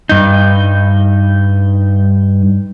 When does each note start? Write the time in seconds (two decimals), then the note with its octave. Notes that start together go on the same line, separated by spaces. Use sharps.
0.09 G2 D#4